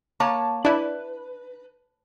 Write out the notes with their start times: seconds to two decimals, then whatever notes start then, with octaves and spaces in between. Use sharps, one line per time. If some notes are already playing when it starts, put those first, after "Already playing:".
0.20 A#3 C#5 A5
0.65 D4 E4 B4 D5